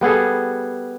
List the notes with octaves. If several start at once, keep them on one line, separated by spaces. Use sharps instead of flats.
G3 B3 G#4 A4